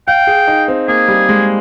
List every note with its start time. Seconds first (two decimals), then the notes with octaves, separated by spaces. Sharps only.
0.08 F5 G5
0.27 G#4
0.48 D#4
0.68 C4
0.88 A#3 G#4
1.08 G3
1.29 G#3